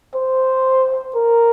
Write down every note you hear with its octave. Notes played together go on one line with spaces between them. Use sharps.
C5
A#4